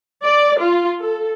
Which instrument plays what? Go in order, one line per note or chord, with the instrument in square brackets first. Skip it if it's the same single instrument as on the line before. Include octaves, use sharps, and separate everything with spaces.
[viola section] D5
F4
A4